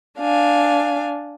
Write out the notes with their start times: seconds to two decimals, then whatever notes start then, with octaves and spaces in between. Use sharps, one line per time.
0.19 D4 F5 G#5